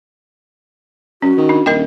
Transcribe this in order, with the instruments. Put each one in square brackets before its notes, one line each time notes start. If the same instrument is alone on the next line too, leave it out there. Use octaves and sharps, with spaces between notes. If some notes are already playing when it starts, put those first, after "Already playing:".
[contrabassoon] F#2 [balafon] C#4 [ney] F#4
[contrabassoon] D#3
[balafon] D4
[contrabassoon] D#1 [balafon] A#4 D#5 G5